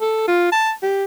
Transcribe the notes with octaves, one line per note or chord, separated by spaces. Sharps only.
A4
F4
A5
G4